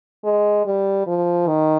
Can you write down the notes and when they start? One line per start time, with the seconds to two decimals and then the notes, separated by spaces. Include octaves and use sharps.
0.24 G#3
0.66 G3
1.07 F3
1.47 D#3